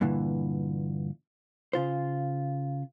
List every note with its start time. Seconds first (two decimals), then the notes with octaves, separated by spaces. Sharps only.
0.01 G2 A#2 D3 E3
1.73 C#3 F4 C5